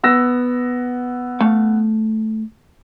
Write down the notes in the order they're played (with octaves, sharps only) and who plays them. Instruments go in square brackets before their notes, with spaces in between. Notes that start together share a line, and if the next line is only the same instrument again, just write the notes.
[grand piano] B3 E6 A#6
[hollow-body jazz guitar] A3 F5